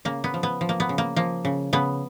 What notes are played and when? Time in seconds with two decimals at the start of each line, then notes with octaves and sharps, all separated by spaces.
0.05 C#3 A#3
0.24 B3
0.34 F3
0.43 B3
0.61 F3
0.69 A#3
0.80 B3
0.89 C#3
0.98 A#3
1.16 F3 A#3
1.45 C#3
1.73 C#3 B3